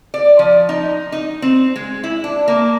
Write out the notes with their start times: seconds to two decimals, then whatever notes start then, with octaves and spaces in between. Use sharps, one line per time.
0.14 D5
0.39 F3
0.69 D#4
1.12 D#4
1.42 C4
1.76 G#3
2.04 E4
2.24 D4
2.48 A#3